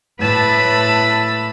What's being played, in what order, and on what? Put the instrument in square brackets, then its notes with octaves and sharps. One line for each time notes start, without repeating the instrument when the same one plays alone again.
[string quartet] A2 B4 A5 B5 E6